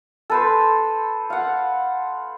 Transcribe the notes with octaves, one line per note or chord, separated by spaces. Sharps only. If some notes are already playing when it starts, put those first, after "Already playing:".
A4 B4 C5
F5 F#5